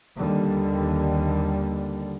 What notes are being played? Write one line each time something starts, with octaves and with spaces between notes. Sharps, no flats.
D#2 D3 G3